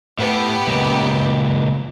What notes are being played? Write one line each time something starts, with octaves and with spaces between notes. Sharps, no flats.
A2 B3 G4
C#2 A#2